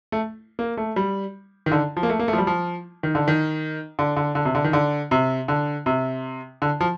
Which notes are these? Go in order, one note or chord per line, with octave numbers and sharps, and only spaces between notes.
A3
A#3
A3
G3
D#3
D3
F3
A#3
A3
A#3
A3
F3
G3
F3
D#3
D3
D#3
D3
D3
D3
C3
D3
D#3
D3
C3
D3
C3
D3
F3